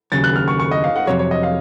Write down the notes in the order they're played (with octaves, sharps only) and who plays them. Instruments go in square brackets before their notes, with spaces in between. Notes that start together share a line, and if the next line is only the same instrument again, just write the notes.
[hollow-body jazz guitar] D#2 C#3 F#3 [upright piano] A6
[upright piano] F#6
F6
C#6
C#6
D#5
F5
F#5
[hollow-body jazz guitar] F2 C3 F#3 [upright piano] C#5
[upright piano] C#5
D#5
F5